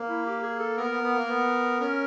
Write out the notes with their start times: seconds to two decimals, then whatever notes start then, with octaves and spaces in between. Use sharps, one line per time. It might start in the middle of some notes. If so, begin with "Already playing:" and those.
Already playing: A#3
0.08 E4
0.26 G4
0.42 G#4
0.59 A4
0.77 B3 A#4
0.90 B3
1.03 B3
1.15 A#3
1.28 B3
1.80 C#4 A#4